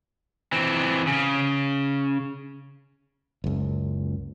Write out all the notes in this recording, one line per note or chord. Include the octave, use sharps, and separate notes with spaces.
E3 C4
C#3
F#1 C#2